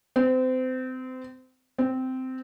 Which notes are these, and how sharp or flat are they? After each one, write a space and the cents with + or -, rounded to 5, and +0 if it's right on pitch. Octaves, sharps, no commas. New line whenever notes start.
C4 -30
C4 -15